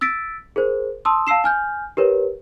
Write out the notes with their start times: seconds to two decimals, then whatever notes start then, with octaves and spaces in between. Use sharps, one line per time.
0.01 E6 A6 B6 D7
0.56 G#4 A#4 C5
1.05 A5 C6 D#6 E6
1.27 F5 A5 E6 C7 E7
1.44 G#5 F6 G6
1.97 G4 A#4 B4 C#5